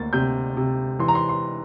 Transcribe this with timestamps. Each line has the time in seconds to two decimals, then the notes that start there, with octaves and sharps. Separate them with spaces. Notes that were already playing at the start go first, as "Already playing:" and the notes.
Already playing: D2 A#3 A6
0.13 C3 G6
0.57 C3
0.99 E3 C6
1.08 A#5
1.15 C6
1.29 C6